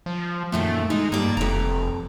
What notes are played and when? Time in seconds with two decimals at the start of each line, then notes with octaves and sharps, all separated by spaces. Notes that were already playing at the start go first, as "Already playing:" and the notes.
0.06 F3
0.52 F#2 A#2 D#3 A3
0.90 G#3 D#4
1.12 G2 A#3 D5
1.37 F1 F2 A#5